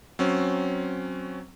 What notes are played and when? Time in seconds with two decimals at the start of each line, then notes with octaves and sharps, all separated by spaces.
0.19 F#3 C4 C#4